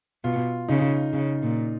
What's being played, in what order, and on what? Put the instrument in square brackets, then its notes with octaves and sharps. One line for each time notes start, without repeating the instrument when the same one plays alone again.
[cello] B2 [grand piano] F4
[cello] C#3 [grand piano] D#4
[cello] C#3
A#2